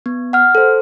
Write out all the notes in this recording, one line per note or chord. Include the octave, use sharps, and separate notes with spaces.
B3
F#5 F6
A4 C5